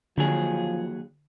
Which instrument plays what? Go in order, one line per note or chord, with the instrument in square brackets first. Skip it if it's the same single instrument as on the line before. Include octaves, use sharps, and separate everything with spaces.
[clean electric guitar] D#2 F#3 G#4 [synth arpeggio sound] D3 [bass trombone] F3